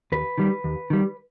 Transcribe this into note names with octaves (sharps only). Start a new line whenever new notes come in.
D#2 B4
D#3 G3
D#2
D#3 G3